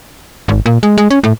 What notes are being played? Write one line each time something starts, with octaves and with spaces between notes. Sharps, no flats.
G#1
A#2
G#3
G#3
C#4
A2